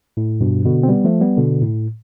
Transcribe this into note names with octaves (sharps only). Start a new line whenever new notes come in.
A2
G2 B2
B2 D3
C4
G3 B3
F3 A3
G3 B3
B2 D3
A2